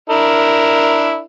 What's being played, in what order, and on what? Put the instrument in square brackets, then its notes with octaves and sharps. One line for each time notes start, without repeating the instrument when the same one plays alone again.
[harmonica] D4 E4 A#4